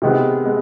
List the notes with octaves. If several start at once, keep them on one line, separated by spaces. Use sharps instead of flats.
C3 D#3 G#3 B3
G#3 B3